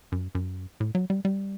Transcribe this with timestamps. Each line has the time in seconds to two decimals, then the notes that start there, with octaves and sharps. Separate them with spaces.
0.12 F#2
0.35 F#2
0.80 A2
0.95 F#3
1.10 G3
1.25 G3